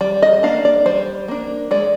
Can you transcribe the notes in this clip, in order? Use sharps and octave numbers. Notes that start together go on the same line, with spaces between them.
G3 D5
D#5
A#3 D4 F5
D5
G3 C5
A#3 D4
G#3 D5